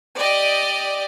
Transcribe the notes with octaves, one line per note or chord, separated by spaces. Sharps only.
G4 D5 D#5